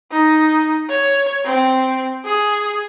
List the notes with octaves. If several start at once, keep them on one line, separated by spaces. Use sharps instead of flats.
D#4
C#5
C4
G#4